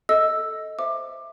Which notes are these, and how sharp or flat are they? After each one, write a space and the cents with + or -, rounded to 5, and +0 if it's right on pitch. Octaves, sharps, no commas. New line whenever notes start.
A4 +0 D#5 +20 E6 +0
C5 +0 E5 +10 D6 +20